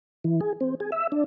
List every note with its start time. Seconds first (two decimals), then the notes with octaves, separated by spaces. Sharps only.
0.24 E3
0.41 G#4
0.61 C4
0.80 G#4
0.92 E5
1.12 D4